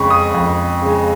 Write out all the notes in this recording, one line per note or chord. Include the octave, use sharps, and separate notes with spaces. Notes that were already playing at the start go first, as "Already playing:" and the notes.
Already playing: F2 C#3 G#3 B5 C#6
D#6
F2
C#3 G#3